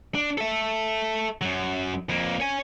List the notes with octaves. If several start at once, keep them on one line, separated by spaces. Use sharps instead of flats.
D4
A4 E5
F#2 F#3
F2 A#3
C#5 G#5